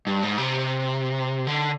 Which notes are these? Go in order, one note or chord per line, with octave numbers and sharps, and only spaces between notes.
G2
G#2
C3
D3